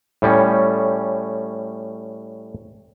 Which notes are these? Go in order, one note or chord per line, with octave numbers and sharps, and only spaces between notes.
A2 G3 C#4